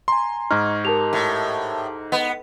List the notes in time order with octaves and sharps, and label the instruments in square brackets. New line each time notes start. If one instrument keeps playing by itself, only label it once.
[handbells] G#5 A#5 [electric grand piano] C6
[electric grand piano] G#2 D#4 [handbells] C#6 G#6 [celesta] F6
[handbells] G4 A5 [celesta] A#4 F7
[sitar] A2
[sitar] B3 [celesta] D#5